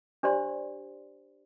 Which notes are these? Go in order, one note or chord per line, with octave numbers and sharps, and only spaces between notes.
D4 G4 C5 D5 C6